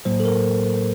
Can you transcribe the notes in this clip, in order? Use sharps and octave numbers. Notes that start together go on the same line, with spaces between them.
A2 F#3 A#3 C5
A4
A#4